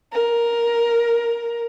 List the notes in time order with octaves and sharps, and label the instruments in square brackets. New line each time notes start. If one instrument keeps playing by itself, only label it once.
[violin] A#4